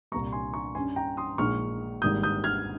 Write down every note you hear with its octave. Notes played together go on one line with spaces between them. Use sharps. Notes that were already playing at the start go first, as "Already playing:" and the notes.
C2 A#2 G3 A#5 C#6
G#5 C6
A#5 C#6
G2 G3 C#4 G#5 C6
G5 A#5
C6 D#6
A#1 A#2 G#3 D#4 C#6 F6
G#1 G#2 G3 A#3 D#6 G6
D#6 G6
F6 G#6